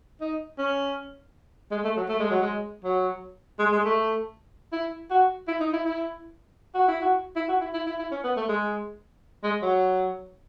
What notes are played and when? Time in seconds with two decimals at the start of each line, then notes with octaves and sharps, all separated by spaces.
0.21 D#4
0.59 C#4
1.71 G#3
1.84 A3
1.97 F#3
2.09 A3
2.20 G#3
2.31 F#3
2.42 G#3
2.84 F#3
3.60 G#3
3.72 G#3
3.85 A3
4.73 E4
5.10 F#4
5.48 E4
5.60 D#4
5.73 E4
5.85 E4
6.75 F#4
6.88 E4
7.02 F#4
7.36 E4
7.49 F#4
7.61 E4
7.74 E4
7.86 E4
7.99 E4
8.12 C#4
8.24 B3
8.37 A3
8.49 G#3
9.44 G#3
9.62 F#3